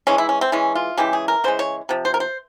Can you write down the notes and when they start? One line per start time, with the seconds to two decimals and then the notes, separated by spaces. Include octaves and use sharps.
0.07 E3 G#3 C#4
0.18 E4
0.29 C#4
0.41 C4
0.52 E3 G#3 C#4
0.75 F4
0.97 C#3 E3 G#3 G4
1.13 G#4
1.28 A#4
1.44 C#3 E3 G#3 C5
1.59 C#5
1.89 C3 F3
2.05 C5
2.14 A#4
2.20 C5